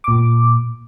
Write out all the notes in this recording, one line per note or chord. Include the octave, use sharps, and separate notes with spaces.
A#2 D6